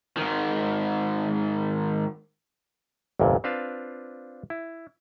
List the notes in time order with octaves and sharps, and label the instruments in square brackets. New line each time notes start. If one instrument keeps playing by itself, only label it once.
[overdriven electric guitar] G#2 D#3
[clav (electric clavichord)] G1 C2 F2 A#2
C4 D4 F4 B4 F5 A5
E4